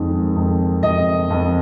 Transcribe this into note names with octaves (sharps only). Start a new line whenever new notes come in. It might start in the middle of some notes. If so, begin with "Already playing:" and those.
Already playing: F2 D#3 G#3
F2
F2 D#5
F2